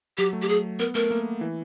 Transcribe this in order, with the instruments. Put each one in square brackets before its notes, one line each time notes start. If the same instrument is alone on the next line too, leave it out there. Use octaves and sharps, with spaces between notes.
[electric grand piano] F#3 [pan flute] G4
[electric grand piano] A3
[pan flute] G4
G#4
[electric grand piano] B3 [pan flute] A#4
[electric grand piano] A3 [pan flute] A#4
[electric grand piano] A#3
E3